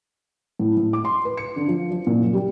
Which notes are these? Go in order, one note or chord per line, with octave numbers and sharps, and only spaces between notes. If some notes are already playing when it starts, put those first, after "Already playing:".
A2
A2
D6
C6
B4
C#7
D3
F3
F3
A#2
F#1
G3